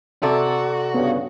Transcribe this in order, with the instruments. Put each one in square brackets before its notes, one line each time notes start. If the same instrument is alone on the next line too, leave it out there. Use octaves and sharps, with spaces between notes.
[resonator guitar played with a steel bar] C3 A4 D5 [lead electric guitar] F#4
[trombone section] G2 C#3 [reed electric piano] B3